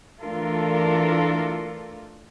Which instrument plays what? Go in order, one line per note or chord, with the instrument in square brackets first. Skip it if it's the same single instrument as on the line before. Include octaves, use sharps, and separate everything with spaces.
[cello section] E3 A3 D4 F4 A4 A#4